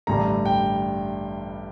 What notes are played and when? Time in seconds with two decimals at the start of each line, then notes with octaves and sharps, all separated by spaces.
0.07 A1 G2 D3 G3 A#5
0.45 G5